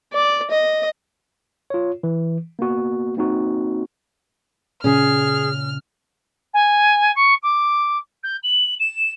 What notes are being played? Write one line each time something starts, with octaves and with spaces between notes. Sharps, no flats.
D5
D#5
F4 C#5
E3
A#3 B3 F#4
A#3 C4 D#4 F#4
A#2 C#3 C#4 G#4 F6
G#5
C#6
D6
G6
F#7
E7